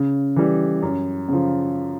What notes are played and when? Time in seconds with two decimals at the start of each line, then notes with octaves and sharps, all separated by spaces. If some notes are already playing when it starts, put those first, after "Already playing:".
Already playing: C#3
0.36 E3 G3
0.82 F#2
1.29 C#3 F3